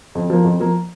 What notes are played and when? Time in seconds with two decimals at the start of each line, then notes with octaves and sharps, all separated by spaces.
0.15 F2
0.30 F3 A#3
0.44 F2
0.60 F3 A#3